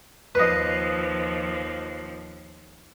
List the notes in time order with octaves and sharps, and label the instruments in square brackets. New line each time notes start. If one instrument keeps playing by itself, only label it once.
[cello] D#2 F3 [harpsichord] B4 D#5